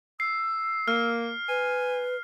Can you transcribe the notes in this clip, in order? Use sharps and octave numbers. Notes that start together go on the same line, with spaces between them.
E6 C7
A#3 F6
B4 G#5